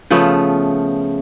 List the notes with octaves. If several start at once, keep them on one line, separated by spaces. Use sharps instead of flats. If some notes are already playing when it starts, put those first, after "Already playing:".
C#3 F3 A3 B3